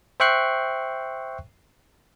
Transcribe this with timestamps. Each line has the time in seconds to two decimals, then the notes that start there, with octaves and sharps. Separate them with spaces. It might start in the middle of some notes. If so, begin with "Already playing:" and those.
0.20 C5 E5 G5 C#6 F#6 C7